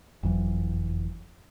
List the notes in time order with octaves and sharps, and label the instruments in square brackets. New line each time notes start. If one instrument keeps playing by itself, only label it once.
[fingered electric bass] F#1 F2 E3 F#3